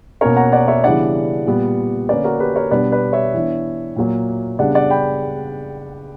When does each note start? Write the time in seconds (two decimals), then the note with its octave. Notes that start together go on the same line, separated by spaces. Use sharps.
0.21 B2 A#3 C#4 A#4 C#5
0.36 F#5 A#5
0.52 D5 F#5
0.68 C#5 E5
0.84 C#3 E3 G3 B3 D4 D5 F#5
1.46 A#2 G3 B3
2.09 D3 A#3 C#4 B4 D5
2.24 F#4 A#4
2.40 G4 B4
2.56 A#4 C#5
2.71 B2 G3 B3 D4 B4 D5
2.92 B4 D5
3.13 C#5 E5
3.34 E3 B3 D4
3.96 A#2 F#3 A#3
4.59 C#3 G3 B3 D4 D5 F#5
4.75 D5 F#5
4.90 G5 B5